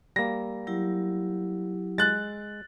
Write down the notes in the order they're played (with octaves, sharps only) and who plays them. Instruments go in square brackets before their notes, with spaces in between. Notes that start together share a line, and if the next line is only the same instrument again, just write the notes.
[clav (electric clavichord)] G3 A#3 [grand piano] A#6
[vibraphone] F#3 E4 G4
[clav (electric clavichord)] G#3 [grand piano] F#6 A6